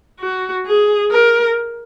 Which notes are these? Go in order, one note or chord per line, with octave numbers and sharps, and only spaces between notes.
F#4
G#4
A#4